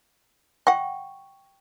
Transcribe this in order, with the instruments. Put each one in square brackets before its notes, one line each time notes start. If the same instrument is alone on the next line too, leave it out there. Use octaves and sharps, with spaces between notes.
[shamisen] D#5 F#5 [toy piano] G5 C#6